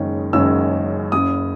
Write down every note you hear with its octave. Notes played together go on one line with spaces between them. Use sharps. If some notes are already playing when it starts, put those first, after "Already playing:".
Already playing: F#1 F#2 D#3 G#3 C#4
F#1 F#2 D#3 G#3 C#4 E6
F#1 F#2 C#3 D#6